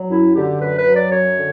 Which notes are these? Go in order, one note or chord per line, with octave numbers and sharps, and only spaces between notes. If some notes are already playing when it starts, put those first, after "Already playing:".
Already playing: F#3
F#2 E4
D3 G4
F#2 B4
B4
F#3
D5
F#2 C#5
D3